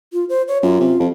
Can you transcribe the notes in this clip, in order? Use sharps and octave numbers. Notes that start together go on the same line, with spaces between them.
F4
C5
C#5
F#2 F4
C3
F2